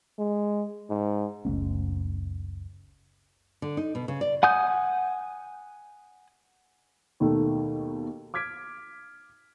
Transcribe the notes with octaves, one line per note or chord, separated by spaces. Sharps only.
G#3
G#2
F#1 C#2 A3 C#4
D3
D#4
B2
C#3
D5
F#5 G#5 D#6 G6
D#2 B2 D#3 A3
D6 F6 G#6 B6 D7